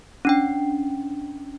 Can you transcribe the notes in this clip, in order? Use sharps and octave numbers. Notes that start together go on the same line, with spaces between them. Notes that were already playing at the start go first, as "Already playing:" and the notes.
C#4 D4 G5